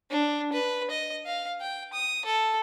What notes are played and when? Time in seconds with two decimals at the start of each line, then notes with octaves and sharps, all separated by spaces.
0.11 D4
0.53 B4
0.90 D#5
1.26 F5
1.61 G5
1.93 D#6
2.25 A4